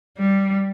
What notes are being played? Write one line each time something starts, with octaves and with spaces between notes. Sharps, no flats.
G3